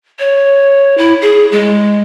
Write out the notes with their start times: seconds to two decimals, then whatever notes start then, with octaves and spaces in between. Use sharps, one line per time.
0.19 C#5
0.98 E4
1.22 G#4
1.52 G#3